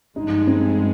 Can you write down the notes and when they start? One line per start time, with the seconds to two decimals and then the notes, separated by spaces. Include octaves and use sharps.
0.16 G#1 G2 F3 G#3 D#4
0.47 C4